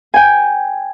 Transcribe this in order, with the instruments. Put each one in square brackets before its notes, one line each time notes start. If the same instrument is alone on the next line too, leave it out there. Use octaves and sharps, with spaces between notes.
[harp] G5 G#5